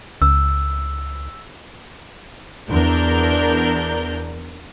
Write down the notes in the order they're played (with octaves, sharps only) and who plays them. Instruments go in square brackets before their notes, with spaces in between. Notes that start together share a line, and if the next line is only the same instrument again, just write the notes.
[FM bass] C#2 [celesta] E6
[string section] E2 D4 A#4 G6